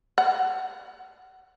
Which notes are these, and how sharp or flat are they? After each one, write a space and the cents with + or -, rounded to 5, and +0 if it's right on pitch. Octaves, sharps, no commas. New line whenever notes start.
F#5 +20